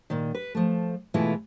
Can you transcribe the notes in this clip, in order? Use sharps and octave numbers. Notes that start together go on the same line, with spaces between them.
A#2 D#3
B4
F3 A3
B2 E3 G#3 A3 E4 F4